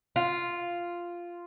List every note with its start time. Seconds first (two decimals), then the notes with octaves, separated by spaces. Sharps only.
0.16 F4